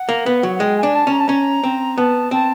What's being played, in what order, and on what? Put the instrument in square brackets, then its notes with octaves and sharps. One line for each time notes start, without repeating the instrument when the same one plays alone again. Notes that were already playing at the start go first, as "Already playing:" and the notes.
Already playing: [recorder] F#5
[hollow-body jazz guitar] A#3
B3
F#3
[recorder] F#5
[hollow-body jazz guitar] G#3 [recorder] G5
[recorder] G#5
[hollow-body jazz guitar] D4
[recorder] A5
[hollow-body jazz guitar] C#4 [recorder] A#5
[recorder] A5
[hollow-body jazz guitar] C#4 [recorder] A#5
[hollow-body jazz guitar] C4
[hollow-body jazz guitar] B3 [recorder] A5
[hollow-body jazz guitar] C4 [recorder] A5